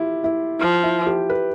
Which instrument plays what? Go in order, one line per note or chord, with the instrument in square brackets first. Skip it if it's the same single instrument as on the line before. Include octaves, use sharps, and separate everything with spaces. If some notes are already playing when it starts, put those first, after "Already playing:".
Already playing: [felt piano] E4 F4 G4
E4
[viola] F3
[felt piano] E4
G4
B4